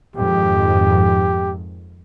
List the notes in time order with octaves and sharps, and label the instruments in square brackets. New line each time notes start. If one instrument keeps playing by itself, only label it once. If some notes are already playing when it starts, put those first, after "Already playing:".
[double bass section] F2 G#2 D#3 [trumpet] G4